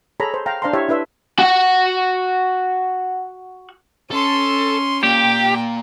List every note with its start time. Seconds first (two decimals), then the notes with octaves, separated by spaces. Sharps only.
0.20 G#4 A4 C#5 A#5 B5
0.34 C5
0.46 F5 G5 A#5
0.62 D4 C5 F5 A5 A#5 C6
0.73 E4 G4 C#5 E5
0.89 D4 E4 B4 E5 C6
1.39 F#4 F#5
4.11 C#4 A4 C6
5.03 A#2 G4 G5